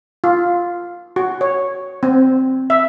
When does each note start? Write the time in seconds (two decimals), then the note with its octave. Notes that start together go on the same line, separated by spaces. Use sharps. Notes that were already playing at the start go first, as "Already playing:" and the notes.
0.24 F4
1.16 F#4
1.41 C#5
2.03 C4
2.70 E5